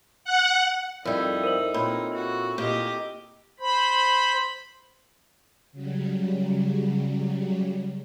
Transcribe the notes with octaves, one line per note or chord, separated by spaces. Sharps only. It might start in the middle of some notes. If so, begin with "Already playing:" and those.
F#5
F2 G3 D#4 E4 A4 A#4 D5 E5
A#4 C5 F#7
A#2 C4 A#4 C#5 B5
F#4
A#2 G4 D#5
C5 B5
C#3 F#3 G3